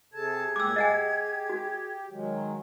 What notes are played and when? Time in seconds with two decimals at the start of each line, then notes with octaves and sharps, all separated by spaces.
0.14 C3 G#4 A4 A5 G#6
0.56 A#2 G4 F#5 D6 E6
0.76 G4 D#5 F#5 G#5
1.50 F#4
2.11 D#3 F#3 G#3